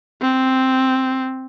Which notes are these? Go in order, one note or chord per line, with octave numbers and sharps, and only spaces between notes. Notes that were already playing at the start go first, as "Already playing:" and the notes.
C4